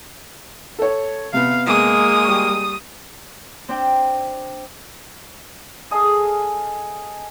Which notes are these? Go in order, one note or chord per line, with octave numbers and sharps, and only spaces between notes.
A4 C#5
C3 B3 F5
G#3 A#3 D#6
G3 C#6
C4 D4 G5
G#4 A4 D#5 F5